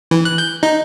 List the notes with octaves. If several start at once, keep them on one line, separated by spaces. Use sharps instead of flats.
E3
F#6
G6
D#4